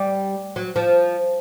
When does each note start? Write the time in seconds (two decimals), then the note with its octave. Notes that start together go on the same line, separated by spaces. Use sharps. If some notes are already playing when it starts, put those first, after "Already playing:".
Already playing: G3
0.56 F#3
0.76 F3